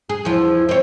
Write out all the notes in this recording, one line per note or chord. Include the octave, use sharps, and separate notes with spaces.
G#4
E2 F3 E4
C4 C#5